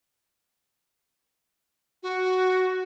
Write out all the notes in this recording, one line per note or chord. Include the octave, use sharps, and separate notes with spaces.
F#4